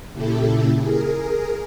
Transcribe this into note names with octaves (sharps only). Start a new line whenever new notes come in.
A#2 C#3 E4 G4 A4
G#4 A#4